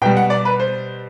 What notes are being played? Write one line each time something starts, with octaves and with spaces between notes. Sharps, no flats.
B2 G3 G5
F#5
D5
B4
C5